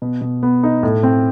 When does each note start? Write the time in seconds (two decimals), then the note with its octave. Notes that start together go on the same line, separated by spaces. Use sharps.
0.02 B2
0.21 B2
0.43 B3
0.63 D#4
0.83 A2
1.03 C4